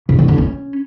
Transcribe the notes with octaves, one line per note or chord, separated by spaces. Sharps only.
C#3
D#3
D3
C#4